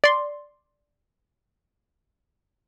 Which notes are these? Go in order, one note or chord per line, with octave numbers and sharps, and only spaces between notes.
D5 C6